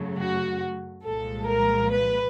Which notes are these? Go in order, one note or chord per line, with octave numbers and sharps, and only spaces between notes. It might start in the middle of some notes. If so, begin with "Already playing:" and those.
Already playing: F#2 C#3 F#3 A3
F#4
C2 A#2 F3 G#3 A4
A#4
B4